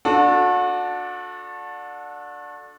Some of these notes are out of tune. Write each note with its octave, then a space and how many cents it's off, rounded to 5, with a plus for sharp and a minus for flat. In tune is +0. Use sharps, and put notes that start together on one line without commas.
D4 +0 F#4 -35 A4 +0